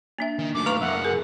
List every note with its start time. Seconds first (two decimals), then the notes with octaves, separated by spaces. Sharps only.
0.18 A#3 D4 E5
0.39 D#3
0.54 F#2 A3 D6
0.66 B4 F5 A#5 C#6 F6
0.81 F#2 A#3 E5 F#5
1.05 G#4 A#4